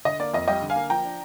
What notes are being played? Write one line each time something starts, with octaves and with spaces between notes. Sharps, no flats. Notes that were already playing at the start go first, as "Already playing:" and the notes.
D3 D#5
A#3 D5
F2 D#5
G3 D#5 G5
D3
F5 G#5
A#3
F3 G5 A#5
D4